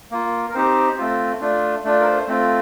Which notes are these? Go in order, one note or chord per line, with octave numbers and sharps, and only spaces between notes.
A#3 F4
A#4
C4 D#4 G4 C5
A3 C4 F4
A3 D4 F4
A3 D4 F4
A#4
C5
A3 C4 F4